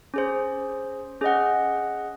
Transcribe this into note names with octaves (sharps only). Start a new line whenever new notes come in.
C#4 G#4 C5
C#4 G#4 D#5 F#5